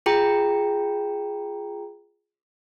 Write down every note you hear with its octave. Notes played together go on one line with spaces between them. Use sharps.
F4 G#4 G5 A#5